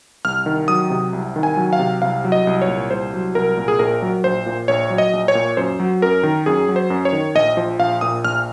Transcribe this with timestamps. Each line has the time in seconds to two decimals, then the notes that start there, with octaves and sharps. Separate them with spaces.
0.25 C2 F6
0.46 D#3
0.68 F#3 D#6
0.90 C3
1.13 C2
1.36 D#3
1.43 G#5
1.57 F#3
1.73 F5
1.79 C3
2.02 C2 F5
2.24 F#3
2.32 D#5
2.47 C2
2.62 C#5
2.68 A#2
2.90 C2 C5
3.14 F#3
3.35 C2 A#4
3.57 A#2
3.68 G#4
3.79 A#1 A#4
4.02 F#3
4.24 A#1 C5
4.46 A#2
4.68 A#1 C#5
4.90 F#3
4.98 D#5
5.13 A#1
5.28 C#5
5.35 A#2
5.57 F#2 C5
5.80 F#3
6.02 F#2 A#4
6.23 D#3
6.46 F#2 G#4
6.68 F#3
6.76 C5
6.90 F#2
7.05 C#5
7.13 D#3
7.35 A#1 D#5
7.57 F3
7.79 A#1 F5
8.01 A#2 D#6
8.24 A#1 F6